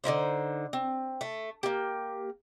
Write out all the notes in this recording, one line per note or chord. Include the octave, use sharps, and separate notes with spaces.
D3 D#4 E4 C5
C4
A3
A#3 G4